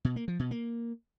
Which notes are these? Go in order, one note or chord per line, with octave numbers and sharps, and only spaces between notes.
B2
A#3
F3
B2
A#3